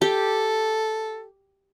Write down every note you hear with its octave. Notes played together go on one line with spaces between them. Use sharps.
G4 A4